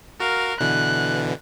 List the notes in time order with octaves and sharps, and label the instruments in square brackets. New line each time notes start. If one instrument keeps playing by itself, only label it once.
[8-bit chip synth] F#4 F5 [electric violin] A#4
[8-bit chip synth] B2 D3 E3 [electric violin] F#6